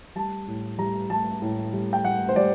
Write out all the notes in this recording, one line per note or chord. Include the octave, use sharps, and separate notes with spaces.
G3 A5
A2
G3 A#5
G3 A5
A2
G3
G5
G3 F#5
C5
G3 D5